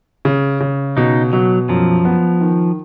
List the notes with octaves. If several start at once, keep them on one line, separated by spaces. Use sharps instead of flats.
C#3
C#3
B2 D#4
B2 F#3
F#2 F3
B3
D#3